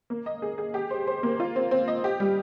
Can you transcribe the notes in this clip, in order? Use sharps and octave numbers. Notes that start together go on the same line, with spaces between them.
A#3
D#5
G#4
G#4
G4
C5
C5
A#3
F4
C4
C4
D#5
G4
G3